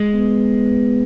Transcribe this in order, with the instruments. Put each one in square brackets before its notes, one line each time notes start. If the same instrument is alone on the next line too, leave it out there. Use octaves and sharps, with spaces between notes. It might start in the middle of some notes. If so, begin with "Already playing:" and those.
Already playing: [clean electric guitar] G#3
[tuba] B3